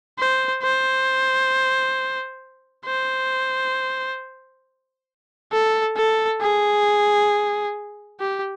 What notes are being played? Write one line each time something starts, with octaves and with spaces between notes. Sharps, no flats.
C5
C5
C5
A4
A4
G#4
G4